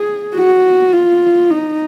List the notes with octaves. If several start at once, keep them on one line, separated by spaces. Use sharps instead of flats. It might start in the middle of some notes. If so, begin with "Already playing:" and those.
Already playing: G#4
F#4
F4
D#4